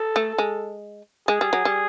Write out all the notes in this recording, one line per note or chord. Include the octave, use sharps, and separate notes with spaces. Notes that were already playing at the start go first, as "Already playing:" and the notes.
Already playing: A4
A3
G#3
G#3 G#4
G3
F#3
G3